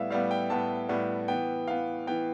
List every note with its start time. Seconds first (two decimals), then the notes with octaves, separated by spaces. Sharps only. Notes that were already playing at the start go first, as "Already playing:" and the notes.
Already playing: A2 G3 B3 E5 F5
0.10 A2 G3 B3 F5
0.31 G5
0.50 A2 G3 B3 A5
0.89 A2 G3 B3
1.28 E3 B3 G5
1.67 E3 B3 F5
2.07 E3 B3 G5